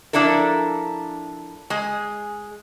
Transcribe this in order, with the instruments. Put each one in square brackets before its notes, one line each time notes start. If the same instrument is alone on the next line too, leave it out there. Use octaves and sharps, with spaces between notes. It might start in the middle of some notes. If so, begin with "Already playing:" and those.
[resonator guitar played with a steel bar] F3 D4 E4 A4 A#4
G#3 G#4